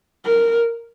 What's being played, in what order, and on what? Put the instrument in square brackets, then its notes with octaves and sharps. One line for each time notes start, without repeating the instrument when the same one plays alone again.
[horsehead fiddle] A#4